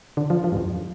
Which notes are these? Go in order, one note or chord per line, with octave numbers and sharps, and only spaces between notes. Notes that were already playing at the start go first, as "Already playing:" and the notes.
D3
F3
F3
G2
F2